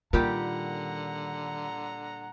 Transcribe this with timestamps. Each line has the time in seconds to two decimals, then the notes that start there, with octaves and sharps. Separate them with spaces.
0.13 A#2 D3 D#3 G3 G4 F#5 A#5